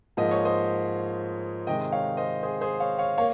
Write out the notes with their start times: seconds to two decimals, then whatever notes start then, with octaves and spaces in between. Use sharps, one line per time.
0.17 G#2 F3 A#3 D#5
0.31 C#5
0.45 C5 D#5
1.67 C3 D#3 G#3 D#5 G5
1.92 C#5 F5
2.17 C5 D#5
2.43 G#4 C5
2.61 G#4 C5
2.80 C#5 F5
2.98 C#5 F5
3.18 A#3 C#5 F5